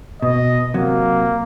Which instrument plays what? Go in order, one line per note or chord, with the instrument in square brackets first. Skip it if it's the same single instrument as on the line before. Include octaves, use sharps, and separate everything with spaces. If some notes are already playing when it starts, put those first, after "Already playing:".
[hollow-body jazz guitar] B2 [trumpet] D#5
[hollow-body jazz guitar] C3 F#3 [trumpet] A#3